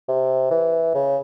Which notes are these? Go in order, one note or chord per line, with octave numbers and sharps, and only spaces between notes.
C3
E3
C#3